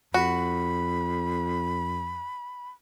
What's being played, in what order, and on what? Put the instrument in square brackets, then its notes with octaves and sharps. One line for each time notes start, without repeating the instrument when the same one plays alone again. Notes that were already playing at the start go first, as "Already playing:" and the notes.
[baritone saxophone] F2 [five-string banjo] F#4 [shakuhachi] B5